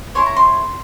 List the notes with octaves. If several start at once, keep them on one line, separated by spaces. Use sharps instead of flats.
E4 G#4 C#5 C6
A#5
C6